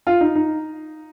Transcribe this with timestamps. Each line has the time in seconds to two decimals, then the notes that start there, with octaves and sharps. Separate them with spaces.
0.07 F4
0.21 D#4
0.35 D#4